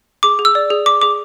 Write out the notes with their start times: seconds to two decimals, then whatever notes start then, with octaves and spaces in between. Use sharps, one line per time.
0.23 G#4 D6
0.39 G#4
0.45 E6
0.55 D5
0.70 G#4
0.86 G#4 D6
1.02 G#4 D6